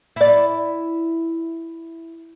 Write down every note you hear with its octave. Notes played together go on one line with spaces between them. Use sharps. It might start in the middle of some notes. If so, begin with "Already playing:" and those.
E4 D5